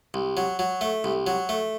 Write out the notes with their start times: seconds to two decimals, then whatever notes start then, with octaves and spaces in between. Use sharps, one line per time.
0.14 C2
0.37 F#3
0.59 F#3
0.81 A3
1.04 C2
1.27 F#3
1.49 A3